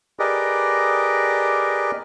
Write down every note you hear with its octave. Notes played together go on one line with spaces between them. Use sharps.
G4 G#4 A#4 B4 D5 D#5